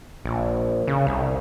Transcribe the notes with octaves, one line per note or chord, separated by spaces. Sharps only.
A#1
C#3
C2